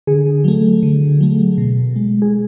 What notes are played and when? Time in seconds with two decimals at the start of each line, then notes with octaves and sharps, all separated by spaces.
0.07 D3 G#4
0.44 F#3 A3
0.83 D3
1.20 F#3 A3
1.58 B2
1.96 G#3
2.22 G#4